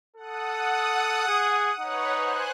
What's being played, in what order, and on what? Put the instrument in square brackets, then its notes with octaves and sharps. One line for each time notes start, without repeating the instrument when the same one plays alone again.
[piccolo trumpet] A4 [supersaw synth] F#5 D#6
[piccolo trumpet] G#4
[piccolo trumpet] D#4 [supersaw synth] B4 C#5 F#5
[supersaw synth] C5 G#5 F#6